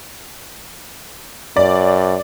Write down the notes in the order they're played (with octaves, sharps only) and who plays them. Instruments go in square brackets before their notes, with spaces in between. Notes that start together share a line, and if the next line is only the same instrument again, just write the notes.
[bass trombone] F#2 [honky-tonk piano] D5